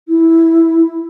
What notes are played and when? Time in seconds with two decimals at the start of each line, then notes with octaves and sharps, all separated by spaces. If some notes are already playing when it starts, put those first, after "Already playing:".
0.08 E4